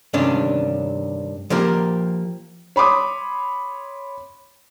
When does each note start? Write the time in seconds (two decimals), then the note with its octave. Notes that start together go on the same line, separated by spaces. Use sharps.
0.13 G2 C3 D#3 C#4 D4
1.50 F3 A#3 G4 A#4
2.76 C#5 B5 C6 D6 D#6